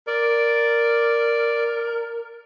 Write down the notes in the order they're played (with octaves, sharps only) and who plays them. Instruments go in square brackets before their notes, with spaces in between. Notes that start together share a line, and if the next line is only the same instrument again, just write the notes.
[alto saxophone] A#4 [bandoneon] D5